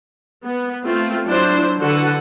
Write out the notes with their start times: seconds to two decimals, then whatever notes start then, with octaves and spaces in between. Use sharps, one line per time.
0.44 B3
0.84 A3 C4 F4
1.26 F#3 D4 E4 C5
1.79 D3 F#4 A4 B4 F#5